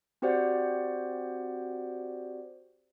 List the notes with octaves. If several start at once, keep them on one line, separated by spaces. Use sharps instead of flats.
C4 F#4 G4 C5 D5 F#5